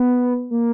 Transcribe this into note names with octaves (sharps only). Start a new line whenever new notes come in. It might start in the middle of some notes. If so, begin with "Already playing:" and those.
Already playing: B3
A#3